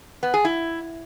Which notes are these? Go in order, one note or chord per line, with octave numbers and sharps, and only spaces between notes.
B3
G#4
E4